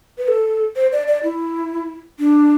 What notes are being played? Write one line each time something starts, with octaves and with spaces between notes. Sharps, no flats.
B4
A4
C5
D5
D5
E4
D4